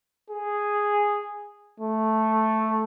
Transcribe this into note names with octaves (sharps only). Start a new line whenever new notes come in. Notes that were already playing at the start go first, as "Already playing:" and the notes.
G#4
A3